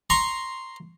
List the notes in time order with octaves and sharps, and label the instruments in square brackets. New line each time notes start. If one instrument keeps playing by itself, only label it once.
[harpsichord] A#5 C6 C#6